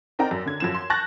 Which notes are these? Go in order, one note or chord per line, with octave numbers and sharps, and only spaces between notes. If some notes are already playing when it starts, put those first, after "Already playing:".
C4 D#4 A#4 D5 G5 A#5
F#2
D3 G#6
F#2 F3 E7
C6
A5 C#6 F#6 G6 A6 A#6